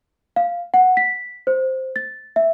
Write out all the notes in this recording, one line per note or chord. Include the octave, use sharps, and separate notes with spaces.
F5
F#5
B6
C5
A6
E5